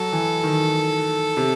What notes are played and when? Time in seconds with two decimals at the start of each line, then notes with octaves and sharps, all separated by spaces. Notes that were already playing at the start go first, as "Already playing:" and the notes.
Already playing: F#3 A4
0.13 E3
0.43 D#3
1.37 C3